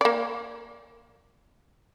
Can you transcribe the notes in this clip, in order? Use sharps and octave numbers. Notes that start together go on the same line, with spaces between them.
A#3 D5